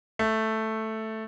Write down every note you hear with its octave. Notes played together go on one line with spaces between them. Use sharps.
A3